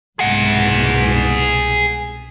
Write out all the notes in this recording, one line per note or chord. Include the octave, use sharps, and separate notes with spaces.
C2 G#2 B2 G#4 F#5